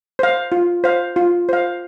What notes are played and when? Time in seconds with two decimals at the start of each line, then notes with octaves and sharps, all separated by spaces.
0.19 C5 F5
0.52 F4
0.84 C5 F5
1.16 F4
1.49 C5 F5